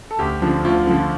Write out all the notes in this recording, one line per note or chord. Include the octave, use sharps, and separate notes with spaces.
A4
D2 G4
D3 F3
D2 F4
D3 F3